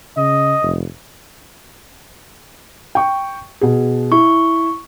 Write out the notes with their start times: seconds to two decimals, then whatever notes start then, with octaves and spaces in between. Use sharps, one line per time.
0.17 C#3 D#5
0.62 F1
2.95 G5 C#6
3.61 B2 G#4
4.12 E4 C#6